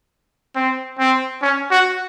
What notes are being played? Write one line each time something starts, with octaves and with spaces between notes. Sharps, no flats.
C4
C4
C#4
F#4